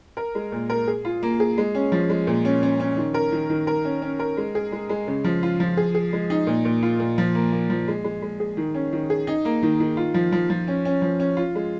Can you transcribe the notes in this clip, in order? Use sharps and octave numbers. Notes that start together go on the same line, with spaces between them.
A#4
G#3
A#2
A#4
G#4
F4
A#3
G#4
G#3
C#4
F3
G#3
A#2
C#4
C#4
C#4
D#3
A#4
D#3
D#3
A#4
C#4
C#4
A#4
G#3
G#4
G#3
G#3
C#3
F3
F4
F3
G#4
G#4
G#3
D#4
A#2
A#2
F4
A#2
F3
A#3
A#3
F3
G#3
G#3
G#3
G#4
D#3
C#4
D#3
G#4
D#4
A#3
D#3
D#3
F4
F3
F3
F3
C#4
C#4
F3
C#4
F4
G#3